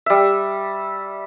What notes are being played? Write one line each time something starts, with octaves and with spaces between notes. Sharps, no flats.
G3 E5